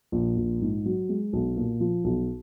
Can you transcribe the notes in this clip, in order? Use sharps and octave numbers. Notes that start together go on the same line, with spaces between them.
A#1
A#1
G#2
F#3
G#3
B1
A#2
F3
B1